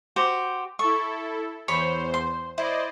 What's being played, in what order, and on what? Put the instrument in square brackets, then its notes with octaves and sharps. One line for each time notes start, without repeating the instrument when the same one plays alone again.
[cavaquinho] F#4 G4 C5
[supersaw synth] E4 A4 [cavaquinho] C#6
[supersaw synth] E2 C5 [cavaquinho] C#5 B5
[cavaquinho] C6
[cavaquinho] E4 [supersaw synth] C5 D5 D#5